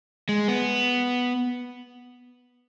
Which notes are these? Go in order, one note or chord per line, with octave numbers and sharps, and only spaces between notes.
G#3
B3